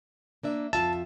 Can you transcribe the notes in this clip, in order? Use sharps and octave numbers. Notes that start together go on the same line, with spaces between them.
A#3 D4 E5
F2 F4 E5 A5